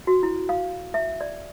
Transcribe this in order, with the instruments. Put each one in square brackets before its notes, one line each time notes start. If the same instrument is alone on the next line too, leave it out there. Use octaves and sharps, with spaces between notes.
[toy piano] F#4
E4
F5
E5
D5